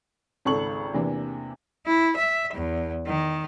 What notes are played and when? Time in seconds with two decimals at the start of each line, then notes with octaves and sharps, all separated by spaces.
0.45 G#1 C#2 A4 C#6 F#7
0.94 E2 C3 E3 A#3 D4
1.85 E4
2.16 E5
2.52 E2
3.07 D#3